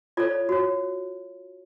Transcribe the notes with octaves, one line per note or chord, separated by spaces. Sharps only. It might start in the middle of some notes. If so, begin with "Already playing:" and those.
F4 A4 C#5 D5
F#4 C#5